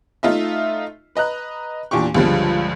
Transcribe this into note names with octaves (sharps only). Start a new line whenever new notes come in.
A3 D#4 F4 D#5 E5
B4 D#5 A#5 F#6
E2 A#2 D4 G4 C#6
C#2 G2 D3 F3 G3 G#3